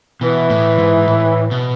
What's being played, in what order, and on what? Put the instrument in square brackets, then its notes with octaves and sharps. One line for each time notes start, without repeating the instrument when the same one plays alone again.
[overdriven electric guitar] B2 [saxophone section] E3
[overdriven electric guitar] A2
G#2
A2
B2